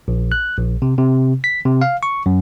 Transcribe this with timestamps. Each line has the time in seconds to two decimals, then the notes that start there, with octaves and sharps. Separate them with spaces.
0.08 A#1
0.32 F#6
0.57 A#1
0.82 C3
0.98 C3
1.44 B6
1.66 C3
1.82 F5
2.03 C#6
2.26 F#2